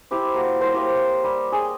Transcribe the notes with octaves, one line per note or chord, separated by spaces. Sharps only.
E4 G4 C5
A#3 F#4
A#4 C5 C#5
G4 F5 D#6
G3
G#4 G5